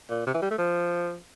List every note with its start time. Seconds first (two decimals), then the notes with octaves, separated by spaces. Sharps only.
0.09 A#2
0.26 C3
0.34 E3
0.42 G3
0.51 A3
0.58 F3